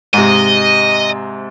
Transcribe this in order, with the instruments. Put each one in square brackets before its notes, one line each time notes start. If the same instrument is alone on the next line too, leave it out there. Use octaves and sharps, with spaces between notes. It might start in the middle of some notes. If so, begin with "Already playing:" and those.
[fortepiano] G#2 C3 [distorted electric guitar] D#5